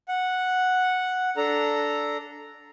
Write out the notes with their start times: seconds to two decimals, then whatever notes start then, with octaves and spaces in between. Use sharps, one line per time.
0.08 F#5
1.37 D4 A4 A#5